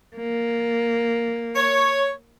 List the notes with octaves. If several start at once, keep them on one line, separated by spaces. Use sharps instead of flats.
A#3
C#5